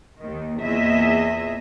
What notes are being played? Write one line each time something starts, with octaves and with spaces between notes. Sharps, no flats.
D#2 D#3
E2 A#2 A#3 G#4 D#5 E5